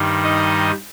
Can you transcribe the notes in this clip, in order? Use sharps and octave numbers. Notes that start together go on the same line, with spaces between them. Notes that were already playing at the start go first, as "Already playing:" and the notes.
Already playing: G2 D#3 G3
D#4 D#5